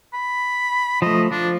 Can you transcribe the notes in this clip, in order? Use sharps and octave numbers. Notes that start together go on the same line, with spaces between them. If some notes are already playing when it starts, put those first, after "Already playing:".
B5
F3 A3 D#5
F3 D4